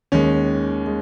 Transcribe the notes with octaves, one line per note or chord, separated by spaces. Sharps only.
D#2 D#3 G#3 C#4
G#3